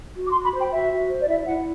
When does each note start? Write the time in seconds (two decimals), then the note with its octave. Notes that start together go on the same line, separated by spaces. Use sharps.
0.16 F#4
0.26 D6
0.31 C6
0.36 F#4
0.45 B5
0.55 C5 G5
0.72 F#4 E5
0.92 F#4
1.10 C5
1.20 D5
1.28 E4 E5
1.47 E4 F#5